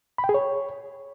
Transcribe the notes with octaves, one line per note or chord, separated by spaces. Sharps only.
B5
G5
G#4
C#5